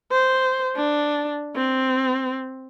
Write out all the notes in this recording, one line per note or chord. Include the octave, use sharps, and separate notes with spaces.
C5
D4
C4